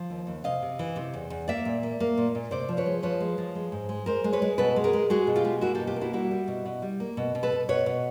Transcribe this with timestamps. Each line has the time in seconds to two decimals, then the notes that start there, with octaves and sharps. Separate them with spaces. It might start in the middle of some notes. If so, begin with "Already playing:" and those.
Already playing: F3
0.10 D#2
0.27 D#2
0.44 C3 D#5 F5
0.62 C3
0.79 E3
0.96 C3
1.14 E2
1.30 E2
1.48 A#3 D5 E5
1.65 A#2
1.83 A#3
2.00 A#3
2.17 A#2
2.35 A#2
2.51 C3 C5 D5
2.69 F3
2.77 B4 C#5
2.86 G#3
3.03 F3 B4 C#5
3.20 G#3
3.38 F3
3.55 G#3
3.72 G#2
3.89 G#3
4.06 G#3 A#4 C5
4.24 G#3
4.33 B4 C#5
4.42 G#3
4.58 B2 A4 B4
4.76 G#3
4.84 G#4 A#4
4.93 G#3
5.10 G#3 F#4 G#4
5.27 B2
5.36 F4 G4
5.45 G#3
5.61 A#3 E4 F#4
5.75 G4 A4
5.80 B2
5.87 F4 G4
5.96 A#3
6.01 E4 F#4
6.13 G3 E4 F#4
6.31 G3
6.48 B2
6.65 B2
6.82 G3
7.00 A#3
7.17 B2
7.35 B2
7.43 A4 B4
7.52 B2
7.69 B2 B4 C#5
7.86 B2